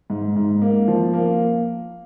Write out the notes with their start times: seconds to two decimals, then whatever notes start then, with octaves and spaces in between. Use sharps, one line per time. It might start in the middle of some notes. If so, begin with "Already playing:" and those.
0.10 G#2
0.36 G#2
0.62 A#3
0.88 F3
1.13 A#3